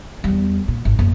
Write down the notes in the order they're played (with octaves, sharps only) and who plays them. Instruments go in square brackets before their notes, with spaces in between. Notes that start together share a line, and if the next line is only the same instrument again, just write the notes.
[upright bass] E2 G3
A#2
G#1
F#2 A#3